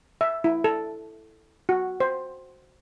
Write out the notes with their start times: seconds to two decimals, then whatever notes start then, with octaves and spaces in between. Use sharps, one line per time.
0.21 E5
0.44 E4
0.64 A4
1.69 F#4
2.00 C5